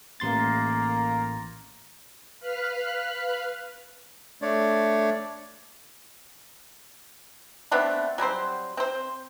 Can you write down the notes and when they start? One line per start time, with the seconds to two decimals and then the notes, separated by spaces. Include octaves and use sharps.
0.20 A1 A#3 A#5 C6 A6
2.39 B4 F5 B5 F6 F#6
4.42 A3 D4 C#5 D5
7.71 A3 B3 C4 D4
8.18 F#3 G3 C4 C5
8.77 C4 C5